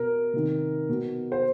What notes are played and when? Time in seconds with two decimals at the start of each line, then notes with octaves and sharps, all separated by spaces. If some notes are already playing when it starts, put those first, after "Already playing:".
Already playing: B2 A#4
0.33 C3 D#3
0.89 B2
1.32 C5